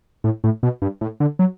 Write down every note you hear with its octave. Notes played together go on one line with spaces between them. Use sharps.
A2
A2
B2
G2
A2
D3
F#3